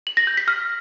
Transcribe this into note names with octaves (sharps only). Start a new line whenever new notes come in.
F#7
A#6
G6
B6
F6